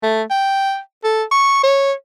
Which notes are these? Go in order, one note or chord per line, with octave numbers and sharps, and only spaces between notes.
A3
G5
A4
C#6
C#5